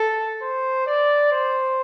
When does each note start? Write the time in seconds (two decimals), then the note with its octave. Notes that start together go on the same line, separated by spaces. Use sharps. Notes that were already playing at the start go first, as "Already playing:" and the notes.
Already playing: A4
0.42 C5
0.87 D5
1.32 C5